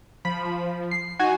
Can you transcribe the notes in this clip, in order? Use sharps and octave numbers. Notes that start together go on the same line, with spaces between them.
F3 B5
C7
D#4 F#4 G#5